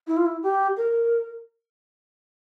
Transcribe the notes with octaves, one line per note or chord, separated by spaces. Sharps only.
E4
F4
E4
G4
A#4